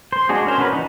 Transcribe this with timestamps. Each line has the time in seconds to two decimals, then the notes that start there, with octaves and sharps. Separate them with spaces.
0.12 C5
0.29 G#3 D4 F#4 G#4
0.46 C#4 A#4 C5
0.58 C#4 D4 F#4 A#4 B4
0.73 E3 D4 D#4